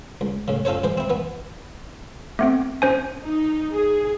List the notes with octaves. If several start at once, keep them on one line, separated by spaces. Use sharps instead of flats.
C#2
A2 C#3
C#4 F4 A4 C5 C#5
G#2 E3 C5
C4 E4
E3 B3
A3 B3 C4
C#4 C5 G#5
D#4
G#4